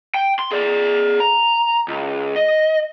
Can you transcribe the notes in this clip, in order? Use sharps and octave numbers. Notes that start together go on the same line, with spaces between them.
G5
C6
G#4 D5
A#5
C#2
D#5